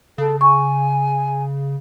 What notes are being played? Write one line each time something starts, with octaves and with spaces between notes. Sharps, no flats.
C#3 A4
G#5 C#6